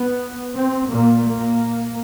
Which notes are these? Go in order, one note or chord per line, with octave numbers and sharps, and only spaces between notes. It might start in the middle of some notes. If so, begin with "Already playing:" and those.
Already playing: B3
C4
A#2 A#3
A#3